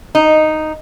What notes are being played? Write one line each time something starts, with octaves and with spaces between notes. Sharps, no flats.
D#4